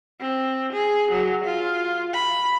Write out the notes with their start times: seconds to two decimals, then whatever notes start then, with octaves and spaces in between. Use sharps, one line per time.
0.20 C4
0.73 G#4
1.11 F#3
1.44 F4
2.13 B5